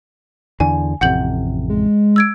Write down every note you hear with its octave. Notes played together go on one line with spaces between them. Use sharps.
E2 D3 G#5
A1 F2 C3 F#5 G6 F#7
G#3
E6 G#6 D7